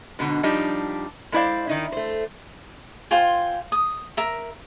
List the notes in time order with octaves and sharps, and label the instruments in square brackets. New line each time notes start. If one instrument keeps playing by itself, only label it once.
[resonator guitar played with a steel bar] G#2 B2 D3
F3 G3 D4 D#4 G4
G#3 A3 E4 C5 D5 F5
D#3 D#4 E4
A3 C5
[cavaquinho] F4 C5 G5 G#5
D#6
A#4 E5